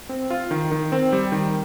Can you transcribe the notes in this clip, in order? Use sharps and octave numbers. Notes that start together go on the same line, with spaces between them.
C4
F4
D#3
D#3
C4
G3
D#3